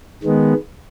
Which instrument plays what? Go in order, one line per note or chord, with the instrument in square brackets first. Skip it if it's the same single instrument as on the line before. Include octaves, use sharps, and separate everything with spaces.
[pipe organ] D#3 G#3 B3